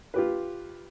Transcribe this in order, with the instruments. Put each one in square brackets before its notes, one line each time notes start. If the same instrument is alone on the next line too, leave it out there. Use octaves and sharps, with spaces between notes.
[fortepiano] F4 G4 B4